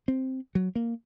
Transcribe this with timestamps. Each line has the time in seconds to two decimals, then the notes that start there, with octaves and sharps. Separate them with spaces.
0.08 C4
0.55 F#3
0.76 A#3